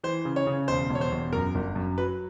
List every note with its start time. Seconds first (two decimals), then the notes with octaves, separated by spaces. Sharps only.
0.03 E3 C5
0.25 C#3
0.36 C#5
0.47 C#3
0.68 E1 C5
0.90 E1
0.95 C#5
1.01 C5
1.12 E1
1.33 F#2 A#4
1.55 G1
1.76 F#2
1.98 F#3 B4